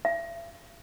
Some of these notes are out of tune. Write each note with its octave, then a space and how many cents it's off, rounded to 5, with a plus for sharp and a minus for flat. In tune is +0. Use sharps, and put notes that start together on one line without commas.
E5 +40